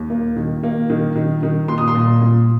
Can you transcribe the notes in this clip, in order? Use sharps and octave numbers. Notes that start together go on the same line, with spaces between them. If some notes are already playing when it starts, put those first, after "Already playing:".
Already playing: D#2
A#3
D#3
A#3
D#3
D#3
D#3
A#2 C6
D#6
C6
A#2
A#2